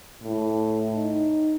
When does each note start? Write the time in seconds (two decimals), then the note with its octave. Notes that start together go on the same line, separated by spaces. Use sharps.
0.23 A2
0.95 D#4